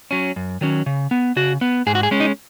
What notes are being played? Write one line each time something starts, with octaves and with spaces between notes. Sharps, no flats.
F#3 C#4
F#2
D#3 F#3 C#4
C#3
B3
C#3 F#4
B3
G#2 G#4
F#4
G#4
G#3 C#4
D#4